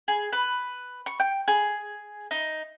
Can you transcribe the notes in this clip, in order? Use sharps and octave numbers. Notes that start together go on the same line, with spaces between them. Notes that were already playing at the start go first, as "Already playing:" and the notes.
G#4
B4
C#6
G5
G#4
D#4